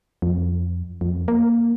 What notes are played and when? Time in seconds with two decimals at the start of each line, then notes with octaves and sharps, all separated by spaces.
0.22 F2
1.01 F2
1.28 A#3